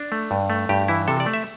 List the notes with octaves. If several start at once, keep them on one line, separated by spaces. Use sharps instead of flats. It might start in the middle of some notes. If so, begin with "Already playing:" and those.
Already playing: D4
A3
G2
A3
G2 G4
E3 E4
C3 A4
D5
A3
E5